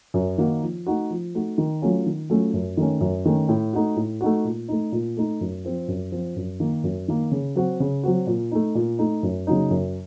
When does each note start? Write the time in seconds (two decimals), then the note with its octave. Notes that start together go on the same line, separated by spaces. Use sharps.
0.14 F#2
0.38 D#3 A#3 D#4 F#4
0.62 F3
0.87 A3 D#4 F#4
1.11 F3
1.35 A3 D#4 F#4
1.58 D#3
1.82 F#3 A3 C#4 F4
2.06 D#3
2.30 F#3 A3 C#4 F4
2.54 F#2
2.77 D#3 A3 C#4
3.01 F#2
3.26 D#3 A3 C#4
3.49 A2
3.73 A3 D#4 F#4
3.96 A2
4.21 A3 D#4 F#4
4.45 A#2
4.69 A3 D#4
4.92 A#2
5.17 A3 D#4
5.41 F#2
5.65 F3 C4 F4
5.88 F#2
6.12 F3 C4 F4
6.36 F#2
6.60 D#3 A#3
6.84 F#2
7.08 D#3 A#3
7.31 C#3
7.56 F#3 C4 F#4
7.80 C#3
8.03 F#3 C4 F#4
8.27 A#2
8.52 A3 D#4
8.75 A#2
8.99 A3 D#4
9.23 F#2
9.47 C#3 F#3 A#3 D#4
9.71 F#2